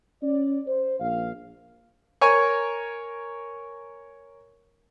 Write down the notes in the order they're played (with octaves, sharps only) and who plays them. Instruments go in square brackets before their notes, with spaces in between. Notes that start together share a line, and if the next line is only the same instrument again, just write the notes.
[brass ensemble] C#4 D5
C5
A#1 F5
[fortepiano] A#4 C#5 G#5 C#6